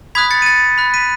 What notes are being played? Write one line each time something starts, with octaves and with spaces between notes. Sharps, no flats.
B5 D#6 F#6 G#6 B6
A6 C#7
D#7
A6 C#7
B5 F#6
B6 D#7